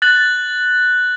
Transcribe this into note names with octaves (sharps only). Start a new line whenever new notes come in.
F#6 A6 F#7